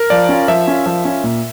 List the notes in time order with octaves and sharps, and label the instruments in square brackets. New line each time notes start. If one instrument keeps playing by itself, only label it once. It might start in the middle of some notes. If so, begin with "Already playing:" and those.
Already playing: [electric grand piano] A#4
[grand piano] F3 [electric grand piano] D5
[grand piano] C#4 F4
[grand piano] F3 [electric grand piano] E5
[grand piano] C#4 F4
F3
C#4 F4
A#2